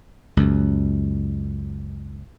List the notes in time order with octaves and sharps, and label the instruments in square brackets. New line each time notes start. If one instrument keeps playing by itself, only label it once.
[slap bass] C#2 F#2